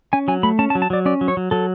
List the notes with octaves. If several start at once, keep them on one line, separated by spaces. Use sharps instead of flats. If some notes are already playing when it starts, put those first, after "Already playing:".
C#4 G#5
F#3 G#5
A3 B5
C#4 A5
A5
F#3
A5
F#3 D5
C#4 D5
F#3
C#5
F#3
F#3 A4